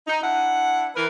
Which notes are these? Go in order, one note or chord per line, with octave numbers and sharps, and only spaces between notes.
D#4
D4 E4 F#5
E3 A#4 B4